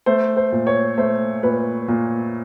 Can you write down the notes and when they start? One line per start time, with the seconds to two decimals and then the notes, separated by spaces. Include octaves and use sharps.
0.06 A3 C5
0.37 C5
0.52 A#2
0.67 C#5
0.98 A3 C5
1.43 A#2 B4
1.88 A#2